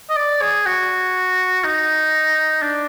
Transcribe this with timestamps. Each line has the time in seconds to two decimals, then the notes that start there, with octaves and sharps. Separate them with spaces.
0.10 D#5
0.16 D5
0.41 G#4
0.66 F#4
1.64 D#4
2.62 D4